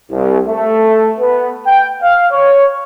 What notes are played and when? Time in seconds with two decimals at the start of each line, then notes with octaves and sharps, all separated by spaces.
0.11 C2
0.47 A3
1.19 B3
1.66 G5
2.01 F5
2.31 C#5